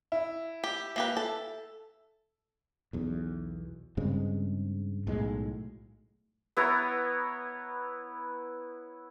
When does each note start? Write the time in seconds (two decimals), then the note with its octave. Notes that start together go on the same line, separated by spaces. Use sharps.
0.12 E4
0.64 G4
0.96 A#3 G4 B4
1.17 A4
2.93 B1 E2
3.97 G2 C#3 G#3 C4
5.07 B1 A2 G#3
6.57 B3 E4 C#5 A#5